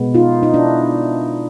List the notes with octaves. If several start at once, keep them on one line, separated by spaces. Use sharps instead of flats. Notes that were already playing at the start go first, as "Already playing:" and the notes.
Already playing: B2 G#3 B3
D#4 F4
D#4
D4 E4